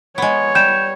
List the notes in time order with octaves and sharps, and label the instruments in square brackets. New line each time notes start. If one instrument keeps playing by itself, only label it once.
[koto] G#3 B3 [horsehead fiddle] C#5
[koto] G3 [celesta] G6 E7